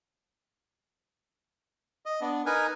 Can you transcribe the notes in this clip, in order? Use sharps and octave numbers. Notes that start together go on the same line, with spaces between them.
D#5
B3 D4
D#4 A#4 B4 G#5